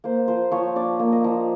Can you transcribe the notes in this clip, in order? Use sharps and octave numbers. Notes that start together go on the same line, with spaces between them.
A#3 C5
F3 C5
F3 C#5
D4 D5
A#3
D#5
F3